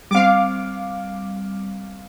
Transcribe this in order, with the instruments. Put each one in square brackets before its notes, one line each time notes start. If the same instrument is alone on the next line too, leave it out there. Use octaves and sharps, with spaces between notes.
[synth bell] G3 C4 [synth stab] F5 D6